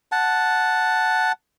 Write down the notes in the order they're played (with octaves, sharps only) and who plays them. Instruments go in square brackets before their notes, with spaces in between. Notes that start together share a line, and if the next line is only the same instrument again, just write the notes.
[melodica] F#5 A5